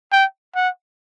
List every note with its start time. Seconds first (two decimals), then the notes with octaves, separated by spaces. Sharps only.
0.12 G5
0.56 F#5